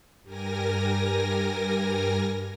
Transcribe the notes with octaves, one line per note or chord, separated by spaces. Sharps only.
G2 G3 A#4 G#5 A#6